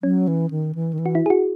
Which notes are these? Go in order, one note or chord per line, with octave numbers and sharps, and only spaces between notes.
F#3 C#4
E3
D#3
E3
D#3
E3
F#4
E4
G#4
F#4